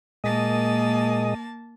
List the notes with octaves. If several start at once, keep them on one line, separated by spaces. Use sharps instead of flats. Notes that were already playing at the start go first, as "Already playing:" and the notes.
A#2 G#3 A#3 D#5 A5